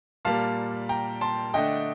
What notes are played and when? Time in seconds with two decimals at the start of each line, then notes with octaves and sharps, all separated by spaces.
0.25 A#2 G3 A#3 F5 A5
0.89 G5 A#5
1.21 A5 C6
1.54 D3 A3 D4 D#5 G5